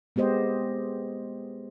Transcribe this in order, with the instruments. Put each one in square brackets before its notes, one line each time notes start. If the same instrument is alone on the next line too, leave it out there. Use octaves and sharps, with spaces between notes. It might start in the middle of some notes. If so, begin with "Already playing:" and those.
[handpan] G#3 B3 G4 C5 D#5